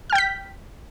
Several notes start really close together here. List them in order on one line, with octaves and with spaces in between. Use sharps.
F6 G5 G6 B6